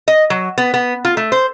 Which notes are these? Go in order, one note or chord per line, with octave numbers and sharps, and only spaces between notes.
D#5
F#3
B3
B3
F4
A3
C5